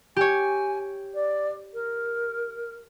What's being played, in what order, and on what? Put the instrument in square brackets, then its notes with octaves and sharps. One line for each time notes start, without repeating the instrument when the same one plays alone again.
[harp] G4 C#5 [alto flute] G#5
[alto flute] D5
A#4